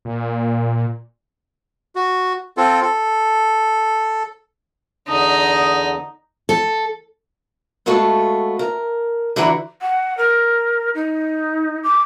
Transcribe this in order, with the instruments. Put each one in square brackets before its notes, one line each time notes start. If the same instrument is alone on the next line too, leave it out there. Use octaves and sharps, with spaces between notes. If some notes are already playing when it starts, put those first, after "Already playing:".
[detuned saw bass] A#2
[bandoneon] F#4
C4 F4 A4
A4
[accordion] E2 D3 D#6 [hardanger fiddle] D#4
[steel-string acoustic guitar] A4
G#3 A3 B3 F4 F#4 A4
A#4
D3 E3 E4 F#4 F#5 A#5
[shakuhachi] F#5
A#4
D#4
D6